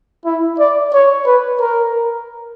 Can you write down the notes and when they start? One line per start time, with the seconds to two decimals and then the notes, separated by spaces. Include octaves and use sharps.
0.26 E4
0.59 D5
0.94 C#5
1.26 B4
1.60 A#4